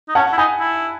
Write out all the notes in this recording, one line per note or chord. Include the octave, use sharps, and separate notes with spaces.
D#4
C#4 F#5 A5
E4
D#4 G#5 B5
E4